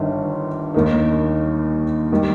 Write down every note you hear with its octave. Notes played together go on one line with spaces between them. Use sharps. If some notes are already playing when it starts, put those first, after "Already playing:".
Already playing: G1 G2 D#3 G3
D#2 D#3 A#3 D#4
D#3 G3